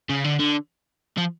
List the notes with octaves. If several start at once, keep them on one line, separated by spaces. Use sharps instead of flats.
C#3
D3
D3
F3